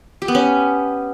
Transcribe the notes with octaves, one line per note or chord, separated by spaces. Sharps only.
G4
B3
C#4